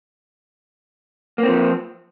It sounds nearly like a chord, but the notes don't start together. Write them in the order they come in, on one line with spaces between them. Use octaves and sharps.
A#3 C4 F3